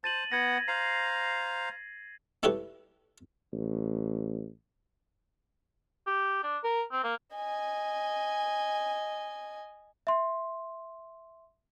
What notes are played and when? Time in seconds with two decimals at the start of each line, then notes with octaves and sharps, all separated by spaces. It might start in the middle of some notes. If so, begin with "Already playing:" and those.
0.04 C5 A5 A6 D#7 F#7
0.32 B3 F#5 G#6 A#6
0.68 C5 F5 A#5 C7
2.43 A3 E4 G4 B4 C#5
3.52 A1
6.07 G4
6.43 D4
6.64 A#4
6.92 C4
7.04 A#3
7.35 D#5 G#5
10.07 E5 C6